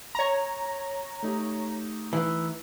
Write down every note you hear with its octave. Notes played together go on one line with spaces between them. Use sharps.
C#5 A#5
A3 D#4 G4
E3